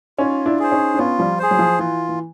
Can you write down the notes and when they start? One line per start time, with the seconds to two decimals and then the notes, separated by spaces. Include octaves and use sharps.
0.19 C#4 D#4 F4
0.46 D4 E4
0.59 G#4 C5
0.72 C#4 D#4
0.94 D4
0.99 B3 C#4 F4
1.19 F3 G3
1.39 G#4 C5
1.51 F#3
1.59 F3
1.79 E3 F4
2.09 E3